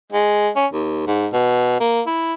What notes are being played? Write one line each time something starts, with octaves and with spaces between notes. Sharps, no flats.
G#3
C#4
D#2
G#2
B2
A#3
E4